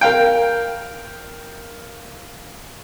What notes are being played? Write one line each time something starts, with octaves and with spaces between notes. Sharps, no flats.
A#4 F5 G5